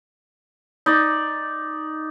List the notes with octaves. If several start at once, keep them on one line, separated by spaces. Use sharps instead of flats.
D#4 D5